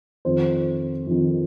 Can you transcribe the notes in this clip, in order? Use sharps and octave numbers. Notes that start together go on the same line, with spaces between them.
F2 D#3 C5
F2 D#3